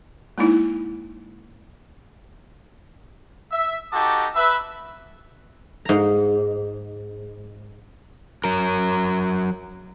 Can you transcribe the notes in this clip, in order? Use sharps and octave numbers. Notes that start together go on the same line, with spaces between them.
G#3 A#3 D#4 E4
E5
D#4 F#4 G4 A4 A5 D6
B4 E5
G#2 A#5
F#3 A#4